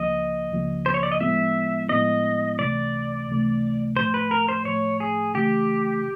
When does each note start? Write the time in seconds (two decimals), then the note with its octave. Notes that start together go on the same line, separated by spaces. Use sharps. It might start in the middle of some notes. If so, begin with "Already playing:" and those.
Already playing: C#2 C#3 F3 A#3 D#5
0.51 C#2 C#3 F3 A#3
0.86 C5
0.94 C#5
1.03 D5
1.12 D#5
1.20 A2 F3 G#3 B3 E4 E5
1.89 A2 F3 G#3 B3 E4 D#5
2.58 C#2 C3 E3 A3 D5
3.28 C#2 C3 E3 A3
3.97 A2 F3 A3 C5
4.14 B4
4.31 A#4
4.48 C5
4.65 A2 F3 A3 C#5
5.00 G#4
5.35 C#3 E3 A3 G4